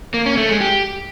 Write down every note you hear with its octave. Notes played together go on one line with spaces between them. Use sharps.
A#3
C#4
A3
G#3
G4